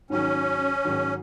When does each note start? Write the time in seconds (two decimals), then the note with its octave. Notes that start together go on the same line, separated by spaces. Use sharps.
0.10 G#2 D#3 F#3 C#4
0.85 G#2 D#3 F#3